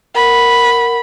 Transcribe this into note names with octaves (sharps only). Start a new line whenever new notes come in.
A#4 F#5 B5